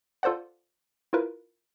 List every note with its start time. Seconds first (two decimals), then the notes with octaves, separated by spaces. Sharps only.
0.23 F4 A4 C5 D5 F#5
1.13 E4 F4 A#4 B4